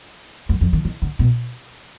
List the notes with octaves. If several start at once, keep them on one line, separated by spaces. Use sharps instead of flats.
F#2
F2
D#3
D#3
D3
B2